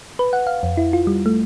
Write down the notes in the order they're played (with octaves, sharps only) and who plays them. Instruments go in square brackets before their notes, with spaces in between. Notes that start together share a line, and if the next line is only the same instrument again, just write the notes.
[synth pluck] B4
F#5
F5
F2
E4
F4
G3
A3